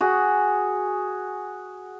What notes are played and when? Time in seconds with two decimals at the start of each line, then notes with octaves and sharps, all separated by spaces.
0.01 F#4 G#4